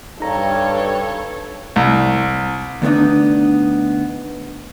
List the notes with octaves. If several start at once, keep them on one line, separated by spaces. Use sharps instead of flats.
G2 D#4 A4 C#5 A#5
C2
D3 A3 B3 C4 D4 D#4